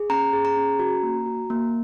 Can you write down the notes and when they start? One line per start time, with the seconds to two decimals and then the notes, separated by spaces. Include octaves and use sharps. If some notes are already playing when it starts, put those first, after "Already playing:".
Already playing: G#4
0.10 C#4 A#5
0.33 G#4
0.45 A#5
0.57 C#4
0.79 F#4
1.03 A#3
1.26 F#4
1.50 A#3